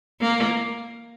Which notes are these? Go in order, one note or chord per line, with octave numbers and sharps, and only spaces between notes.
A#3